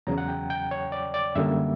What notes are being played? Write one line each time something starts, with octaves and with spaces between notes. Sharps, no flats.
E2 C#3 F#3 A#5
F#5
G5
G5
C#5
D5
D5
F#2 D3 G3 A#3 E5